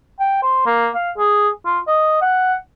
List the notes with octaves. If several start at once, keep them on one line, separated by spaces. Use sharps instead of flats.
G5
C5
A#3
F5
G#4
F4
D#5
F#5